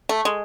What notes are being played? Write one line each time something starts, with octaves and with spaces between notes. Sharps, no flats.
A3
G#3